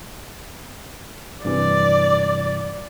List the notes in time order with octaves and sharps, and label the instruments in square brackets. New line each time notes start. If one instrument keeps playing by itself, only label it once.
[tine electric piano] G2 C3 E3 [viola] D5